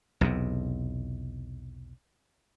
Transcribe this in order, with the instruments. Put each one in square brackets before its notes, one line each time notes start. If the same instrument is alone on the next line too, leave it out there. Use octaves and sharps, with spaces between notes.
[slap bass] B1 E2 C3